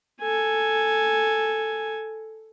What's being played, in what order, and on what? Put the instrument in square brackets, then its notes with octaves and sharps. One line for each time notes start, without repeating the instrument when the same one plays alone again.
[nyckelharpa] A4 G#5